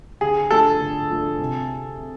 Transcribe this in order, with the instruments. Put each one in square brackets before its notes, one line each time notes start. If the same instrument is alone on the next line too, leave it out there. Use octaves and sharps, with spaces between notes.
[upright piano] D3 [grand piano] G#4
[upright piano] F3 A3 D4 [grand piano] A4
[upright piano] D3
F3 A3 D4
C3